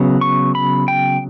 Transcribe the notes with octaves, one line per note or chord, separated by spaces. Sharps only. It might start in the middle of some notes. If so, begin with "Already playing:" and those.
Already playing: C#3 F#3 B3
C#6
B5
G5